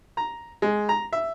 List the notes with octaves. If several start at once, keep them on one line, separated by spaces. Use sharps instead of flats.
A#5
G#3
A#5
E5